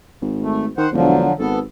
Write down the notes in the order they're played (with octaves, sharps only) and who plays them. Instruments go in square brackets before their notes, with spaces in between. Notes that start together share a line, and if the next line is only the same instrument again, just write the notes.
[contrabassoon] G#1
[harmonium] A3
[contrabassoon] D#3 [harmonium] C5 F#5
[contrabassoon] E1 [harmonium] D3 F3 F#3
[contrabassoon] G#1 [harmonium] B3 A4